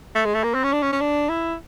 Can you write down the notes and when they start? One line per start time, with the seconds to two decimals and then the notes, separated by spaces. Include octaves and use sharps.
0.15 A3
0.25 G#3
0.34 A3
0.43 A#3
0.54 C4
0.64 C#4
0.73 D4
0.82 C#4
0.92 C#4
1.01 D4
1.29 E4